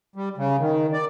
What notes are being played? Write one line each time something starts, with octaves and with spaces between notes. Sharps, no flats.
G3
C#3
D#3
D5